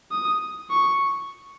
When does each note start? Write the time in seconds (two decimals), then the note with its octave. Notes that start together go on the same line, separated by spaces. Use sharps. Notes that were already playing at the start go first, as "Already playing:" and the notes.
0.12 D#6
0.70 C#6